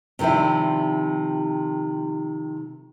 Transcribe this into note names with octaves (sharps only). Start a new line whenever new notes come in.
C3 D#3 F3 D4 E4